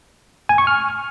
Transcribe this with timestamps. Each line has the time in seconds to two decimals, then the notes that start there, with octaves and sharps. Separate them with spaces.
0.49 G#5
0.58 C#6
0.67 F6